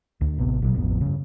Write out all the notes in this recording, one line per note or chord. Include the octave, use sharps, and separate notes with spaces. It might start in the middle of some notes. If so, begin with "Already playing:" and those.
D2
A1 C3 B3
A#1 B2 F#3
D1 A1 F2 B3
G2 C#3